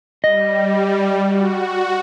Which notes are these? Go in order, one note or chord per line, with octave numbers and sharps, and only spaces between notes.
G3 D#5
F#4